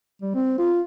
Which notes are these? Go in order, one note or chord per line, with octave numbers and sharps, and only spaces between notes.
G3
C4
F4